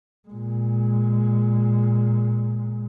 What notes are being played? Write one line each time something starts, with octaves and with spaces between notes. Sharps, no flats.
A#2 G#3